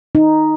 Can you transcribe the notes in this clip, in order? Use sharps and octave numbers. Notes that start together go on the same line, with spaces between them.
D#4